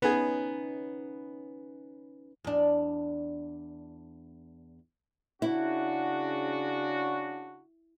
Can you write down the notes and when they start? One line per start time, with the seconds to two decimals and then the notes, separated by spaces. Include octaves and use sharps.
0.02 B3 C#4 D#4 G#4 B4
2.44 E2 D4
5.42 C#3 D4 E4 F#4